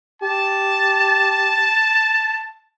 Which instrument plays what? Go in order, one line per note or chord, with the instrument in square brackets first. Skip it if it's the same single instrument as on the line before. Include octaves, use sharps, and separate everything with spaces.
[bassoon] G4 [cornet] A5